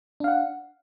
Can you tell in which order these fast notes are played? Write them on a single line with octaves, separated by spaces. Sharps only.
D4 F5 F#5